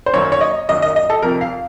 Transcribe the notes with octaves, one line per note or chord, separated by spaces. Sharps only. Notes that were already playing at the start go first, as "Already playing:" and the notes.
C5
F#2 D#3 F#3 A#3 C#5
C#5
D#5
F#2 D#3 F#3 A#3 D#5
D#5
D#5
A4
F2 C3 F3 A#4
F5